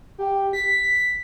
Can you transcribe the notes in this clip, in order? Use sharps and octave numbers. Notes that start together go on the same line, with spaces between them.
G4
B6